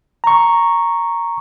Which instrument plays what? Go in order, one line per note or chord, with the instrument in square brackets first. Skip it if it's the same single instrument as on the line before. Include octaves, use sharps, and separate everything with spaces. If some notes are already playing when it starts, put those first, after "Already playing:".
[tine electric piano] A#5 C#6